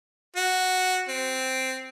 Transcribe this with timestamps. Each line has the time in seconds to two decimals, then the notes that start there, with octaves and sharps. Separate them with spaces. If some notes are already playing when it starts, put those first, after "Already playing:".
0.36 F#4
1.08 C4